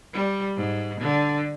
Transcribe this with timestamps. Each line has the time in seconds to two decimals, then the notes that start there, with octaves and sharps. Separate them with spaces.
0.13 G3
0.56 G#2
1.00 D3